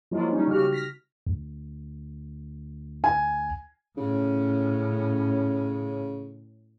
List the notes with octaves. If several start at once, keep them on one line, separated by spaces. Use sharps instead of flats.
F3 F#3 G#3 A#3 E4 F4
G3 C#4 D#4
C#3 F#4 G4 F6
F6 A#6 B6
D2
G#5
A2 C#3 C#4